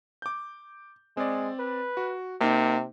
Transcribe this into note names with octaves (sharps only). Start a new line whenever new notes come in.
D6 G6
G#3 C4 D5
B4
F#4
C3 A#3 D#4